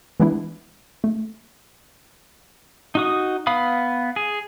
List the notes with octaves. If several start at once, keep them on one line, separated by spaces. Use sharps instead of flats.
E3 G#3 B3 D4 E4
A3
D#4 F#4 D#6
B3 F5 B5 D#6
G#4